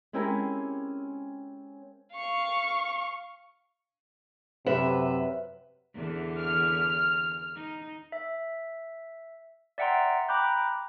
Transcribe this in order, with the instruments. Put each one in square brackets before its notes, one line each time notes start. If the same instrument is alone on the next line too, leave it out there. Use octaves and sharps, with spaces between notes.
[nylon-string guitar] G#3 C4 C#4 E4 G4 A#4
[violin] F5 C#6
[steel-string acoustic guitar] F#2 B4 E5 [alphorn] C3
[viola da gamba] E2 D3
[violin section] F6
[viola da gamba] D#4
[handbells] E5
D5 E5 F#5 G5 A#5 C6
G5 A#5 B5 D6 F#6 G6